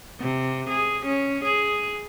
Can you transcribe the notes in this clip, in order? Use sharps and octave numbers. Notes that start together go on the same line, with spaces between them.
C3
G#4
C#4
G#4